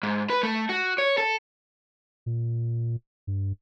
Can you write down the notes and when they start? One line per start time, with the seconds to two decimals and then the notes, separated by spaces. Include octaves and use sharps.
0.03 G#2
0.30 B4
0.43 A3
0.69 F#4
0.98 C#5
1.18 A4
2.26 A#2
3.27 G2